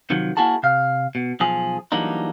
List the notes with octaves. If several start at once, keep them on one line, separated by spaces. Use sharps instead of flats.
C3 D#3 F3 F#3
A#3 E4 F#4 G#4 A5
C3 F5
B2
B1 F3 G#4
E3 F#3 G3 A#3 D4 D#4